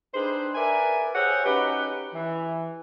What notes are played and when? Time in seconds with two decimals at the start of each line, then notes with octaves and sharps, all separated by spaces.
0.14 D4 D#4 G4 G#4 B4 C5
0.55 A#4 B4 D5 E5 G#5
1.15 G4 G#4 C5 C#5 E5 F#5
1.45 C#4 D#4 F#4 G4 B4
2.14 E3